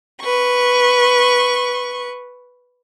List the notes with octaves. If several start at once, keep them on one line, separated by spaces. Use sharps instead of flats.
B4 C#6